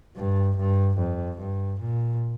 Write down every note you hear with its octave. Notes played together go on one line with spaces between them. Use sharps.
G2
G2
F2
G2
A#2